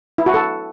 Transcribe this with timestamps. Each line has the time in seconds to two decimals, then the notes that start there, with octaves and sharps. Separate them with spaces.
0.18 E4
0.26 F#4
0.34 A4